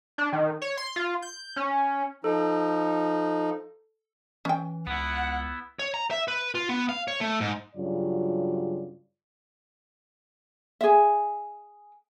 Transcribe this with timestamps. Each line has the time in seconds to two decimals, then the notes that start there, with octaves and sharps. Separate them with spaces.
0.18 D4
0.33 D#3
0.62 C#5
0.78 C6
0.96 F4
1.22 G6
1.56 C#4
2.24 F3 D#4 A4
4.45 E3 C#4 G5
4.87 C#2 B3 E4 F#5
5.79 C#5
5.94 A#5
6.11 E5
6.28 B4
6.55 F4
6.69 B3
6.89 F5
7.08 C#5
7.21 A3
7.40 G#2
7.76 G2 C#3 F#3 F4 D5
10.81 G#4 E5